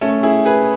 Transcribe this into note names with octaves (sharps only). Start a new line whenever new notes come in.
A3 C#4
E4 G#4
G#4 B4